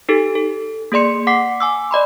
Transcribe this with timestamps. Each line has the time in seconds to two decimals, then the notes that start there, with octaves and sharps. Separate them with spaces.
0.09 D#4 G4 A4
0.35 A4
0.92 A#3 G#4 D5 C6 C#7
1.27 F#5 D6 B6 C7
1.60 G#5 D6 E6
1.91 D5 D#5 B5 C6